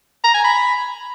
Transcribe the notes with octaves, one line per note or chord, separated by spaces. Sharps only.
A#5
G#5
B5